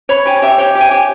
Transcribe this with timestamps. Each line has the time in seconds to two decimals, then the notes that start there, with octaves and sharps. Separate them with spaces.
0.09 C#5 B5
0.26 G4 G#5
0.42 G4 E5
0.58 C#5 G5
0.75 G4
0.81 G#5
0.91 G4